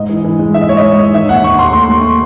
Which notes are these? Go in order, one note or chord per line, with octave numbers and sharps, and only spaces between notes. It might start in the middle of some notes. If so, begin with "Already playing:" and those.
Already playing: G#2 D#5
E3
E3
G#3
G#2 E5
D#5
G#3 C#5
D#5
G#2
E3
D#3 E5
D#2 F#5
D#2 C#6
D#2 C6
A3 C6
A3